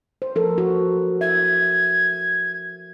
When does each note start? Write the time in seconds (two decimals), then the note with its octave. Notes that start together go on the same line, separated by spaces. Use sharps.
0.22 C5
0.35 F3 A4 A#4
0.58 F#4
1.21 E5 G#6